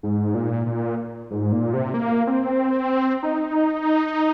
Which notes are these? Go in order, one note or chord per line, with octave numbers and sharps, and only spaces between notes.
G#2
A#2
A#2
G#2
A#2
C3
A#3
C4
D#4